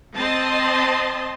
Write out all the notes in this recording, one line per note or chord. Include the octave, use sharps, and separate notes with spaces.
C4 D#5 A5 C6